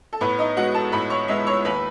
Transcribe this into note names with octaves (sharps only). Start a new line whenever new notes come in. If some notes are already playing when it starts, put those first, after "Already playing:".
A4
A2 B3 B4
D#4 D#5
G#3 B3 F#4 F#5
A4 A5
A2 B4 B5
C#5 C#6
G#3 B3 E5 E6
C#5 C#6
D#2 B4 B5